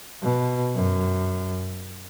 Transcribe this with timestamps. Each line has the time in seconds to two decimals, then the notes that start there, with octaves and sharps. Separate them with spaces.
0.22 B2
0.75 F#2